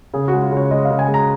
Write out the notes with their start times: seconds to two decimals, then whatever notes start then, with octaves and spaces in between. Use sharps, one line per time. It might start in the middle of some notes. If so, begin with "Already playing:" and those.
0.14 C#3 G#4
0.28 F#4
0.33 G#3
0.42 F4
0.52 C#3 C#5
0.71 G#3 D#5
0.85 F5
0.90 C#3
0.99 G#5
1.08 G#3
1.14 A#5